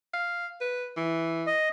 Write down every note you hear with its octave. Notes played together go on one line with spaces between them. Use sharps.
F5
B4
E3
D#5